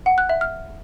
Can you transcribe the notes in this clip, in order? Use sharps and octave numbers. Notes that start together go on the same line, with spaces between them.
F#5
F#6
E5
F6